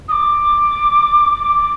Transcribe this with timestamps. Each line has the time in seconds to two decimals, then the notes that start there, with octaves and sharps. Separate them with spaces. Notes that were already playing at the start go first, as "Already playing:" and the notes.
0.08 D#6
0.12 D6
1.34 D6